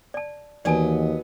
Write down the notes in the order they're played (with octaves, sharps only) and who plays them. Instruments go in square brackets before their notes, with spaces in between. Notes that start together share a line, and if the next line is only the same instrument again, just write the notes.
[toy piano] D5 A5
[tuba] D#2 [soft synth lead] E3 [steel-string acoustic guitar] F#3 B3 D#5 [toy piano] D5 G#5 A5